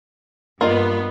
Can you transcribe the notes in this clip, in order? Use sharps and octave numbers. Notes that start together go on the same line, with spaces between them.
G2 A#3 B3 F4 D#5